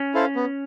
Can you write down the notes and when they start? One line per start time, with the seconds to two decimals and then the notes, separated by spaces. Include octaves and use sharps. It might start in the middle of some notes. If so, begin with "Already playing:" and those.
Already playing: C#4
0.14 E4 A4 C5 F5
0.35 B3